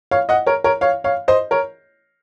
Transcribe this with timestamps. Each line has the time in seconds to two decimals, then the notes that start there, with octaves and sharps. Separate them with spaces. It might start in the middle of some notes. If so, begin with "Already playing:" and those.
0.11 C#5 F5
0.29 D#5 F#5
0.47 A#4 C#5
0.64 A#4 C#5
0.81 C#5 F5
1.04 C#5 F5
1.28 C5 D#5
1.51 A#4 C#5